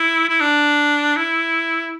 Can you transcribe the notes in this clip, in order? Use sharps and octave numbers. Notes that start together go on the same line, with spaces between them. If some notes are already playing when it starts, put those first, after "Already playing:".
Already playing: E4
E4
D4
E4